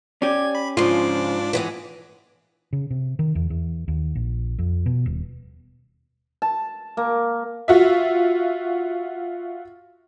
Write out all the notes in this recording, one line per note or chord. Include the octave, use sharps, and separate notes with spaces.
C#4 G4 D5 G#6
B5
G#2 C#3 F3 C#4 D4 F4 D6
E3 G#3 B3
C#3
C3
D#3
E2
E2
D#2
A#1
F2
B2
D#1
A5
A#3
F4 F#4 E5